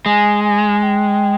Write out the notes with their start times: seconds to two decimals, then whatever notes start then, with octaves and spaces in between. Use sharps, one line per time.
0.06 G#3 G#5
0.45 G#5
0.83 G5